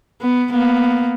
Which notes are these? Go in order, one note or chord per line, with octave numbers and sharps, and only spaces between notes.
B3
A#3 B3